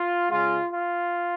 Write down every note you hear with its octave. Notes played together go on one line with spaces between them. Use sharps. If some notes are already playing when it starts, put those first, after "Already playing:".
Already playing: F4
C#3 G#3 F4
F4